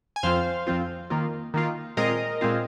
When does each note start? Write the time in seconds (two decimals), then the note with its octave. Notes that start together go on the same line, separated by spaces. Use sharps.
0.16 G#5
0.23 F2 F3 C4 F4 C5 F5
0.67 F2 F3 C4 F4
1.10 D#3 A#3 F4
1.54 D#3 A#3 F4
1.97 A#2 G#3 C4 F4 A#4 D#5
2.41 A#2 G#3 C4 F4